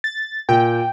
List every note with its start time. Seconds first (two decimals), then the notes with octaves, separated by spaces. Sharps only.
0.04 A6
0.49 A#2 G5